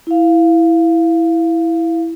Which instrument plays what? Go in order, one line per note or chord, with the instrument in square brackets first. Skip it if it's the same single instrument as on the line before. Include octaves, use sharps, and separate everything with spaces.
[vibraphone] E4 F5